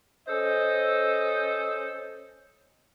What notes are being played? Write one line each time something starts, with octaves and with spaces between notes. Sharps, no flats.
C#4 A4 C5 D#5